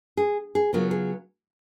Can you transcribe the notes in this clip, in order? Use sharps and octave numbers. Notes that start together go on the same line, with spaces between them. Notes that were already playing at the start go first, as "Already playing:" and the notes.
G#4
G#4
C#3 F#3 B3 F4 A#4
G#4